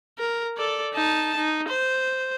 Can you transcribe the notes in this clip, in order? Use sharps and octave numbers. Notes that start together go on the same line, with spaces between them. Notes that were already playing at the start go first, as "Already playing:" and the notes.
A#4
A4 D5
D#4 A5
D#4
C5